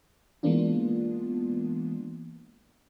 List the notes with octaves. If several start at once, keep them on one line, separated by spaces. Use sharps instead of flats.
E3 G#3 A#3 B3 D4 F4